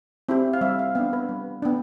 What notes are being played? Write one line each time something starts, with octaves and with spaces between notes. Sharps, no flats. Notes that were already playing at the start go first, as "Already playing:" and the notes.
C4 E4 G4
F5
G3 E5
F5
B3 D4 F5
B4
G3
B3 D4